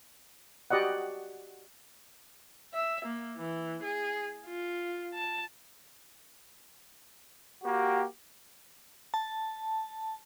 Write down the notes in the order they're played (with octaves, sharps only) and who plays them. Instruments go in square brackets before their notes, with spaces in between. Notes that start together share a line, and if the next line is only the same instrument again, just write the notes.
[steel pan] F#4 G4 D5 D#5 F#5
[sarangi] E5
A#3
E3
G#4
F4
A5
[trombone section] A#3 F#4 G4
[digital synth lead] A5